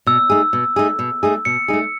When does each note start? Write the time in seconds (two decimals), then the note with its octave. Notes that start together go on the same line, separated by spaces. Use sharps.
0.06 B2 E6
0.30 A3 D#4 G#4
0.53 B2
0.76 A3 D#4 G#4
0.99 B2
1.23 A3 D#4 G#4
1.45 B2 C#7
1.68 A3 D#4 G#4